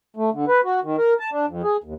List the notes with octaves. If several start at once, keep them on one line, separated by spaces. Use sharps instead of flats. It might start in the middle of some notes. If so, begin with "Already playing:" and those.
A3
D3
B4
F#4
D#3
A#4
A5
D4
F2
G#4
D#2